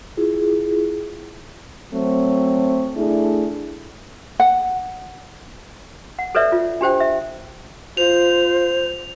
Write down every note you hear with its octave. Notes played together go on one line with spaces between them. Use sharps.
E4 F4 G#4
F#3 A3 C4
A3 D4 E4 G#4
F#5
F#5
A4 B4 C#5 D5 E5
F4
D4 G4 C5 G5
E5
F4 C5 F7